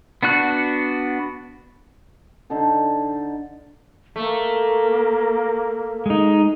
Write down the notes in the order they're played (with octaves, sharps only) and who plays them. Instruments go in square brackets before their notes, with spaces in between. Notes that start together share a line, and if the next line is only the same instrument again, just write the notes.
[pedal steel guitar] B3 D4 F#4 F#6
[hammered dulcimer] D3 D#4 A4 C5
[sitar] A3 [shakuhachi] A#3
[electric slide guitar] G#3 D#4